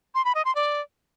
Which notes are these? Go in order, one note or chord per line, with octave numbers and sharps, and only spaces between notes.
C6
B5
D#5
C6
D5